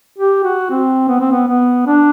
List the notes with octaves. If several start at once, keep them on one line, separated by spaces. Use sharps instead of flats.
G4
F#4
C4
B3
C4
B3
B3
D4